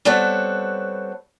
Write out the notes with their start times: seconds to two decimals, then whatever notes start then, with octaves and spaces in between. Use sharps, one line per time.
0.05 G3 B3 C4 A4 C#5 F#5